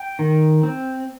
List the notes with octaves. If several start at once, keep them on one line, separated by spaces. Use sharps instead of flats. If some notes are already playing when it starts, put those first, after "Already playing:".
Already playing: G5
D#3
C4